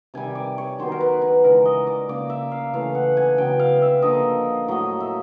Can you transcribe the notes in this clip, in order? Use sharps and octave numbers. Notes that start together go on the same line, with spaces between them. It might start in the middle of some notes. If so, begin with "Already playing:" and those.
C3 D#3 G3 G#5
D5
C#5
D#3 F#3 B3 C5
A#4
B4
B4
C#3 E3 G#3 A#4
D#5
D5
C#3 F3 A#3 D5
E5
F5
C#3 E3 A3 F5
F#5
G#5
C#3 F#3 B3 G5
F5
E5
D3 F3 A#3 D#5
A2 F#3 A#3 D#5
E5